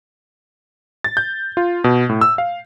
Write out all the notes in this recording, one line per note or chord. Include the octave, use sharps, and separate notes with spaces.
A6
G6
F4
B2
A2
E6
F5